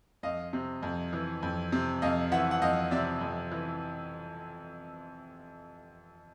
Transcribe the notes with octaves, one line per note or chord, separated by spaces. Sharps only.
F2 D#5 F5
C3
F2
E3
F2
C3
F2 D#5 F5
E3 E5 F#5
F#5
F2 D#5 F5
C3 D5 E5
F2
E3